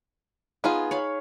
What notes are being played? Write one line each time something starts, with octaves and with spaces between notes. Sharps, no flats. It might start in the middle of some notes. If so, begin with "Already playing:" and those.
B3 D#4 F4 G#4 G#5
C#5 F5 B5